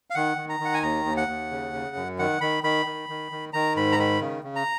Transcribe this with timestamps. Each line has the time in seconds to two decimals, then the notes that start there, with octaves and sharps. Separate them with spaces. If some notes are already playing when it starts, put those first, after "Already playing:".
0.10 F5
0.15 D#3 F#5
0.37 D#3
0.49 A#5
0.60 D#3
0.65 F#5
0.74 G#5
0.83 D#2 A#5
1.05 D#2
1.17 F#5
1.28 D#2
1.51 C#3
1.73 C#3
1.96 F#2
2.19 D#3 F#5
2.41 D#3 B5
2.63 D#3 B5
2.86 D#3
3.09 D#3
3.32 D#3
3.53 D#3 A#5
3.76 G#2 B5
3.92 A#5
3.98 D#3 B5
4.21 C#3
4.43 C#3
4.56 A#5